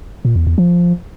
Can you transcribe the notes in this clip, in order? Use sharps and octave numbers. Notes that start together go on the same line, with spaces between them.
A#2
E2
E2
F3